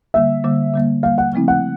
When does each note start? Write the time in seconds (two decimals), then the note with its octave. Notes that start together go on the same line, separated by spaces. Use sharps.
0.14 D3 G3 A#3 E5
0.44 D3 G3 A#3
0.74 D3 G3 A#3
1.03 D3 G3 A#3 F5
1.18 F#5
1.33 C#3 F3 A3 C4 E4
1.48 F#5